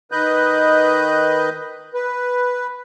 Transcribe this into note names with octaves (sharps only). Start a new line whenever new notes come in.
D#3 B4 D#5 F#6 G6
B4